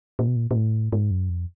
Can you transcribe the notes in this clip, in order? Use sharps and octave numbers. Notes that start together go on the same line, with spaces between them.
A#2
B2
A#2
A#2
A2
G#2
F#2
F2